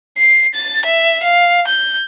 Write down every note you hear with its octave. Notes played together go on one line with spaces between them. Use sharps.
C7
A6
E5
F5
G6